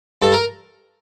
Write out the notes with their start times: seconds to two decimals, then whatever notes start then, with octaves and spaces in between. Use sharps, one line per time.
0.22 G2 A4
0.32 A#4